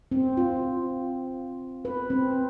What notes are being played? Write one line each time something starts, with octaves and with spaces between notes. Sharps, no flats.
C4
F4
B4
C4